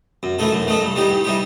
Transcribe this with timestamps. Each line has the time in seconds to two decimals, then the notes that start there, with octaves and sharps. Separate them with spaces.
0.23 F#2
0.39 E3 A3 D#4 A4
0.52 F#2
0.67 E3 A3 D#4 A4
0.81 G2
0.96 E3 G3 D#4 G4
1.10 G2
1.24 E3 G3 D#4 G4